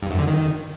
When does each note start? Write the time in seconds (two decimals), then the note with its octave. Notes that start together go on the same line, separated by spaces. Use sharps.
0.03 G2
0.11 F#2
0.19 D3
0.27 D#3